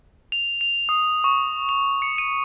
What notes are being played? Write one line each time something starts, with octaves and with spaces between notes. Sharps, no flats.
F7
F7
D#6
C#6
F7
C#7
D#7